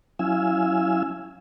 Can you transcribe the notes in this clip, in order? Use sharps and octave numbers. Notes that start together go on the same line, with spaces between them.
F#3 C#4 E4 F5 G#5 E6